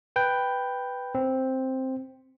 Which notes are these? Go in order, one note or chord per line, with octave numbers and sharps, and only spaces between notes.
B4 G5 G6
C4